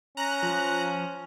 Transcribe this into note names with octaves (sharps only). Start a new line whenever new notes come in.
C#4 A#5 F#6
F3